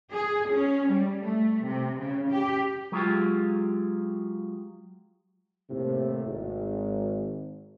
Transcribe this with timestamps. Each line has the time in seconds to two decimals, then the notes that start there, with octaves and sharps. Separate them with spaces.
0.13 G#4
0.53 C#4
0.91 G3
1.23 A3
1.67 C3
1.98 C#3
2.31 G4
2.92 F#3 G#3 F4 G4
5.70 D#2 A2 C3
6.26 G#1